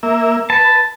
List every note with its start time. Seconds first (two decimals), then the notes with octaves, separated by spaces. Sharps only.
0.03 A#3 E5
0.50 B4 A5